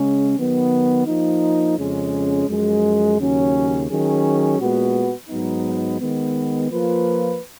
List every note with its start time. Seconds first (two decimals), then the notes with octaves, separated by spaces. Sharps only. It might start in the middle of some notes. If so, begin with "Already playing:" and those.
Already playing: C#3 G#3 C#4
0.36 D#3 F#3 B3
1.07 F3 A#3 D#4
1.77 F2 C#3 G#3 C#4
2.48 F#2 F3 G#3
3.18 D#2 C#3 F#3 C#4
3.89 D#3 F#3 C#4 G#4
4.59 A#2 G#3 B3 F#4 B4
5.29 G#2 F#3 B3 D#4
6.00 D#3 G#3 B3
6.71 F3 A#3 F4 B4